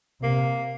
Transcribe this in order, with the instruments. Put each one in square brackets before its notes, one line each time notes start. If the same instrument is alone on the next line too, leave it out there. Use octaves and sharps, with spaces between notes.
[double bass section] C3 [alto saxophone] A#3